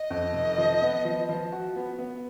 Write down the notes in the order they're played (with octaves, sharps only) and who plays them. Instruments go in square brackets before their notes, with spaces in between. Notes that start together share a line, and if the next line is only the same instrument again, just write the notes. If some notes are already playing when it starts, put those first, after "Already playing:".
Already playing: [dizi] D#5
[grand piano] F2
F1
F3
B3
F3
F3
F#4
B3
B3